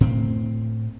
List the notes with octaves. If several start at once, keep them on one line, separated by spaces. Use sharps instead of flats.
A2 C4